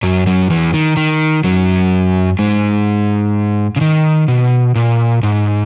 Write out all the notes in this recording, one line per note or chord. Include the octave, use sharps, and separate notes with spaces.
F#2 F#3
F#2 F#3
E2 E3
D#3
D#3
F#2 F#3
G#2 G#3
C#3
D#3
B2
A#2
G#2